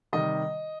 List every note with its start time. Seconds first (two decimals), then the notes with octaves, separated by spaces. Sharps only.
0.13 C3 D#3 G3 D#5